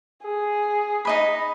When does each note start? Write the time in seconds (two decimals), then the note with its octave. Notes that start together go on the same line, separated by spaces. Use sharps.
0.22 G#4
1.05 D#4 D#5 B5